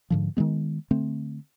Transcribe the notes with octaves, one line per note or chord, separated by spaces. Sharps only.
G#2 D3 F3
D#3 E3 G#3 B3
D3 A3 C4